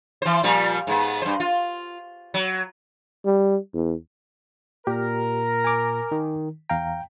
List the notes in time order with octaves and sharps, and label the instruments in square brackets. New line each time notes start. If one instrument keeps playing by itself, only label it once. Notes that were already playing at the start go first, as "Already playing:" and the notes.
[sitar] E3 C5
A#2 F3 G3
G#2 B3
G2 C5
F4
F#3
[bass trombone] G3
E2
[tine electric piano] A#2 [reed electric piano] G4 [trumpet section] A#4
[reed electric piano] G#5 D6
[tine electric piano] D#3
[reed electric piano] E2 F5 A#5 [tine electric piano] G5